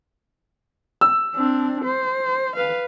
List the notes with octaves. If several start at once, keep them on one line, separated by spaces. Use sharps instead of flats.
E6
C4 D4
C5
B4 F5